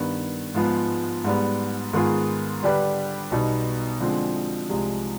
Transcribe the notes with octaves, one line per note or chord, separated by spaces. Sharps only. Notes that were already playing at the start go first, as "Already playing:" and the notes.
Already playing: G2 D#3 B3
G#2 F3 G#3 B3
G#2 G3 B3
G#2 D#3 B3 F4 G#4
D3 G3 D4 G4 B4
B1 B2 G3 B3 D#4
D3 F3 G#3 C4
C2 C3 F3 G#3